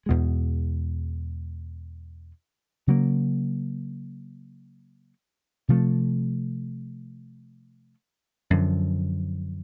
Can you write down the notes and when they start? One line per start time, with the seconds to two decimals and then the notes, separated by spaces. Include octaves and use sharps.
0.06 E2 B2 G#3
2.87 C#3 F#3 A#3
5.68 C3 F3 A3
8.50 F#2 D3 F3